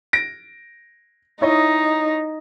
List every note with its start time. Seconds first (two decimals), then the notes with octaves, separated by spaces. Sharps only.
0.13 A#6 D7
1.41 D#4 E4 C#5 D#5